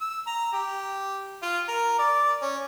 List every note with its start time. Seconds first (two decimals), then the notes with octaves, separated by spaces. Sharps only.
0.01 E6
0.27 A#5
0.53 G4
1.43 F4
1.68 A#4
1.99 D5
2.42 C#4